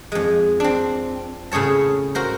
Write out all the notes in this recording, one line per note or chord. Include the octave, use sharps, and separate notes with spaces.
F2 G#3
C4 D4
A2 C#3 G#4 C#5 A5
F#4 A#4 C5